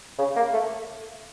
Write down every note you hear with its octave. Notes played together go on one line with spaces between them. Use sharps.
C#3
A#3
A3